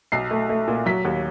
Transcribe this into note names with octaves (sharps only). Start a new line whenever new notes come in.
B1 C7
A3
A3
A#2
F#3 B6
D#2